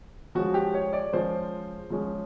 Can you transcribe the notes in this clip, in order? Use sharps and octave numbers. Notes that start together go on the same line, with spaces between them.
F3 G#3 C#4 F#4
G4
C#5
D5
F3 G#3 C#4 C5
F3 G#3 C#4